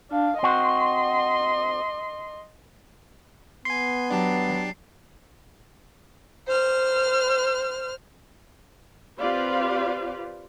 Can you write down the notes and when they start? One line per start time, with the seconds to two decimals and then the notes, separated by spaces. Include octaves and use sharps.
0.11 D4 F5
0.43 C4 F#4 D#5 C6
3.65 B3 G#5 C6 C7
4.10 F#3 D4 G4 A5
6.48 C5 F6
9.19 C4 F4 G4 B4 D5 F5